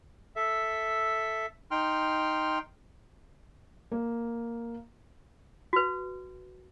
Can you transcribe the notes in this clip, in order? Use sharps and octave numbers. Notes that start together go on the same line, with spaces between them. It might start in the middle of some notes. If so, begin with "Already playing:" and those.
A4 E5
D#4 G5 C6 F6
A#3
F#4 B4